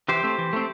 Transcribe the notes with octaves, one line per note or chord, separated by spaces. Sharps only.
E3 G4 C5
A3 C4
E3
A3 C4